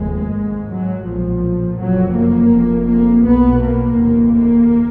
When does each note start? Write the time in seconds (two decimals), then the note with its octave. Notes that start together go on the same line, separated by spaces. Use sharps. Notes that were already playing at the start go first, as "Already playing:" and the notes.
Already playing: F1 D#2 G#3
0.32 G#1 G#2
0.69 F#3
1.05 B1 A#2 F3
1.78 F#1 F2 F#3
2.15 A#3
2.51 F1 F2
2.87 A#3
3.24 B1 B2 B3
3.61 A#3
3.97 F1 D#2
4.34 A#3